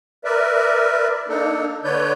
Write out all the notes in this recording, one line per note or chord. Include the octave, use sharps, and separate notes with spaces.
A#4 B4 D5 E5
A#3 D4 D#4 A4
D3 B4 C#5 D5 G6